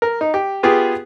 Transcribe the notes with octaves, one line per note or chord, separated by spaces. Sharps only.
A#4
D#4
G4
B3 F4 G4 G#4